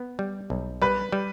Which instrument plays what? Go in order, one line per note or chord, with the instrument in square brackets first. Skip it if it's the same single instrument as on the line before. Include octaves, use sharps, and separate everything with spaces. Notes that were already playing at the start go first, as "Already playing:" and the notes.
Already playing: [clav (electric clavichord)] B3
G3
B1
[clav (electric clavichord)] G3 [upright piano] B4
[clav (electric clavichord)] G3